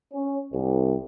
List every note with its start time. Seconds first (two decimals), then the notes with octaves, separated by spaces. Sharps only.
0.14 C#4
0.53 C2